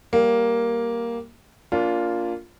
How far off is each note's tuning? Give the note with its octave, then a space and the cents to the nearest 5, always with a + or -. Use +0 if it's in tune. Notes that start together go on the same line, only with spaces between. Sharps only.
G3 +0 A#3 +5 G4 +0
A#3 +0 D4 -30 F4 +0